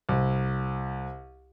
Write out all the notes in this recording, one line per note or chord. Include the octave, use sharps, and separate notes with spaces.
C2